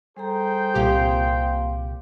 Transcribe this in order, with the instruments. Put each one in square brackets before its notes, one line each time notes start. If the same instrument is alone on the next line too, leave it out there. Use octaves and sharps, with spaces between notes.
[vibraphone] G3 A4 A#5 [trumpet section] G#4 C5 G5
[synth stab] C2 A#2 G4 [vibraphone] A#3 F5 C6